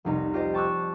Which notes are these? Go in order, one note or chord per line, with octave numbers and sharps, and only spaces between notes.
F1 C2 D#4 A#5
F4 G4 C5 D5 D#5
G5 A5 C#6 D6 E6 F#6